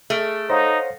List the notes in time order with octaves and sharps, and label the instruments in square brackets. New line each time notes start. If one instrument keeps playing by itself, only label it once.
[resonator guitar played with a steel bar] A3 [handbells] G#4 F6 D7
[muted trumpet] D#4 [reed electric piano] C5 C#5 [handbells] F5 F#5 A#6